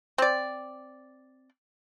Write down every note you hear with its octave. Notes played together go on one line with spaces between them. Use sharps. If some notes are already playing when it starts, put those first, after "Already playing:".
C4 D5